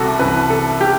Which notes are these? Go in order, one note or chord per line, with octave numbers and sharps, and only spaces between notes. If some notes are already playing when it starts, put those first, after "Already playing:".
Already playing: C2 C3 F#4 A4
C2 C3 E3 B4
A4
G4